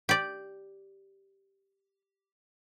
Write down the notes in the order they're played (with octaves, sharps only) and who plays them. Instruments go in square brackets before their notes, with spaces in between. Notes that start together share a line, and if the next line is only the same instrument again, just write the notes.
[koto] G4 D5